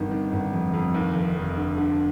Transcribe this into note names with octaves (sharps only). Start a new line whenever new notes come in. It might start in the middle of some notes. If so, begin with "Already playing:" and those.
Already playing: G1 C3 D#3
D#3
G1
F2
F2
D#2
F1
F1
D3
D3